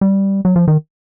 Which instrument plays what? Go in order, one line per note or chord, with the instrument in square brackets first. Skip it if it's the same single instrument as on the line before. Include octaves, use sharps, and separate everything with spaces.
[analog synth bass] G3
F#3
F3
D#3